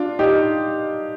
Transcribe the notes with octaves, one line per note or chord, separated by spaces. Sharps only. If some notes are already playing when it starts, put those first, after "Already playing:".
Already playing: D4 F4
D#4 G4